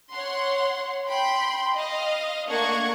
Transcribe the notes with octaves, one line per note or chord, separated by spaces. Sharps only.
C#5 F#5 C6
G5 B5 C6 G6
D#5 F5
A3 A#3 D4 F#5 C#6 G#6